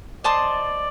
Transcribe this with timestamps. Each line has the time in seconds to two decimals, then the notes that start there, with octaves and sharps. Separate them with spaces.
0.24 C5 D5 D#5 A5 C6